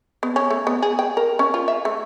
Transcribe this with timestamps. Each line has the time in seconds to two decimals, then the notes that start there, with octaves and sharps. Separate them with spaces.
0.23 B3
0.36 C#4
0.51 A3
0.67 B3
0.82 G#4
0.99 G5
1.17 A#4
1.39 C#4
1.54 F4
1.68 E5
1.85 A3